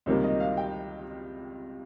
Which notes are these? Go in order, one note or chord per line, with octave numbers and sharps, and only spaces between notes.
C#2 C3 D#3 G3 A#3 C#5
D#5
F5
G5